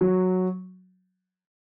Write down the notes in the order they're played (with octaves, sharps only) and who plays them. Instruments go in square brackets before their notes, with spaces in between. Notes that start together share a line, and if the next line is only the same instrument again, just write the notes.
[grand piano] F#3